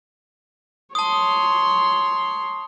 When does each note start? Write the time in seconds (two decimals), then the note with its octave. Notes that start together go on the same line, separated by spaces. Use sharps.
0.95 C#5 A5 C6 D#6